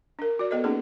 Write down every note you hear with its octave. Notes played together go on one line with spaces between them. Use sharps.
D4 A#4
F#4 D5
B3 A4 B4 D#5
A#3 C#4 D#4 G#4 A4 B4